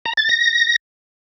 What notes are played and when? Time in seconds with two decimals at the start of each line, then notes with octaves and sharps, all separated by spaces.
0.06 A#5
0.17 A6
0.29 A#6